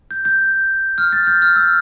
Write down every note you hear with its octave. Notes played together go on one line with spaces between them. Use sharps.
G6
G6
F6
A6
G6
F6
E6